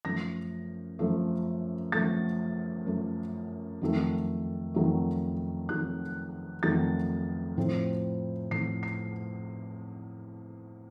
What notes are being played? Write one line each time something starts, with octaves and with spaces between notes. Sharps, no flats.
F#2 F3 A3 A#6
F#2 F3 A3
F#2 F3 A3 A6
F#2 F3 A3
F2 D#3 F#3 A3
F2 D#3 F#3 A3
F2 D#3 F#3 A3 F#6
F2 D#3 F#3 A3 A6
A2 F3 C4
A2 F3 C4 C7
C7